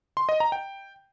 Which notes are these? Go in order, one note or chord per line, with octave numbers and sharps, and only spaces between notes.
C6
D#5
A#5
G5